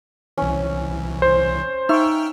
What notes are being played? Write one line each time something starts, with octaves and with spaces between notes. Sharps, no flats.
C2 E3 C#4
C5
D#4 E5 G5 C#6 F6